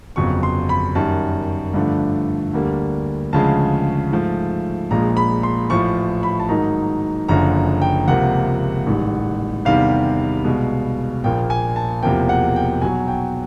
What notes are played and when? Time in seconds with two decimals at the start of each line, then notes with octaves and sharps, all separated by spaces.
0.16 G1 F2 C#3 F#3 C#6
0.43 C6
0.69 B5
0.95 F#2 D#3 G3 A5
1.74 G2 D3 F3 A3
2.53 D2 D3 G3 A#3
3.33 D2 C#3 F3 G#3 A5
4.12 G#2 F3 A3
4.90 A#1 A#2 F3 G#3 A#5
5.17 B5
5.43 C6
5.70 A1 A2 F3 A3 C#6
6.23 B5
6.40 A5
6.49 G#2 D#3 F#3 A#3 D#4 A#5
7.28 F#1 F#2 D3 F3 A#5
7.82 G5
8.07 C#2 C3 F3 A#3 F#5
8.86 A1 G#2 D#3 G3
9.65 E2 C3 D#3 G3 F5
10.44 C2 B2 G#3
11.24 A#1 A#2 F3 A#3 G5
11.50 G#5
11.76 A5
12.03 E1 E2 C3 F3 A#3 G5
12.29 F#5
12.56 G5
12.82 B1 B2 F#3 G#5
13.08 G5